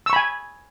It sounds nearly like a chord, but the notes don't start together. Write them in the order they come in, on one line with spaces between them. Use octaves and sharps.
E6 C#6 B5 G#5